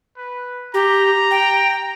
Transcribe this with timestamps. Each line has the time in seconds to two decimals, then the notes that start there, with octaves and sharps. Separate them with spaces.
0.17 B4
0.74 G4 A#5
1.31 G5